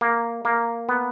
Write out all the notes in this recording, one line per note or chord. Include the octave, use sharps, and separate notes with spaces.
A#3
A#3
B3